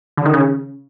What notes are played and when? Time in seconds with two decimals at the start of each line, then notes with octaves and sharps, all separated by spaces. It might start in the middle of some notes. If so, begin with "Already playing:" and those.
0.18 D3
0.25 D#3
0.33 C#3